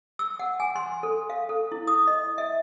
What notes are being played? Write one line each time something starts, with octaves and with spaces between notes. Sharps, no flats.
E6
F#5
G#5
C6
A4
F5
A4
E4
D#6
D#5
E5